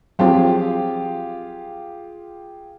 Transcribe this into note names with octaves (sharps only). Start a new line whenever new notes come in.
F3 F#3 C4 F4 G4 G#4